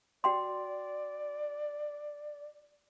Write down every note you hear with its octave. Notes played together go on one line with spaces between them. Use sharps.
F#4 D5 G5 C6